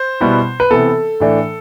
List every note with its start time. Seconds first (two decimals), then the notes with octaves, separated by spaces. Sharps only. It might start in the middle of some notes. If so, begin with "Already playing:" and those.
Already playing: C5
0.21 B2 G3 B3 E4
0.60 B4
0.70 C3 E3 B3 A4
1.20 A2 E3 A3 D4